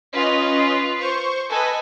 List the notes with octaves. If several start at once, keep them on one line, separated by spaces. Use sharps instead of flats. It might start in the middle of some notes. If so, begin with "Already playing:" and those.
C#4 F4 B4 D#5
C5 C#6
A4 B4 D#5 G#5